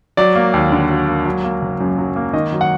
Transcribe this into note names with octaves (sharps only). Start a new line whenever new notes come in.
F#3 D5
A#3
D#2
D3
F#3
A#3
F#3
A#3
F#1
F#2
F#3
A#3
D#3 D#5
F#3
F#5